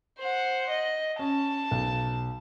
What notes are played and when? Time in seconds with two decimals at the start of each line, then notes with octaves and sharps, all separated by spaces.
0.19 C5 F#5
0.70 D#5
1.19 C#4 A5
1.71 B1